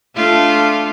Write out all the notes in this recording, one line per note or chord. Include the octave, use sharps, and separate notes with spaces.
A3 D4 F4